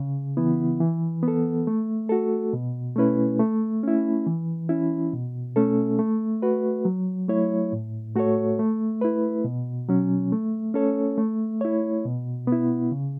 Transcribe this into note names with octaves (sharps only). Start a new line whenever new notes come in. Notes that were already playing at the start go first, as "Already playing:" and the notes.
Already playing: C#3
E3 B3 E4
E3
B3 A4
A3
F#4 A4
B2
A3 C#4 E4 B4
A3
C#4 E4
E3
C#4 E4
B2
A3 C#4 A4
A3
F#4 B4
F#3
A3 E4 C#5
A2
A3 F#4 A4 C#5
A3
E4 B4
B2
F#3 C#4
A3
C#4 A4 C#5
A3
E4 C#5
B2
B3 E4
C#3